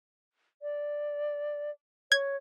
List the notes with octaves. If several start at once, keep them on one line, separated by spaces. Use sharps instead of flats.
D5
C#5 G#6